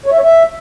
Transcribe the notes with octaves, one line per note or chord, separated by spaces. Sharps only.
C#5
E5
C#5
E5